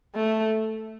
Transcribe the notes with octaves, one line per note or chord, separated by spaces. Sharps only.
A3